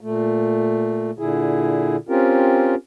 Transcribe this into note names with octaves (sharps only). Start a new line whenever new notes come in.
A#2 A3
A#2 D3 E4 G#4
C4 C#4 F4 G4 A#4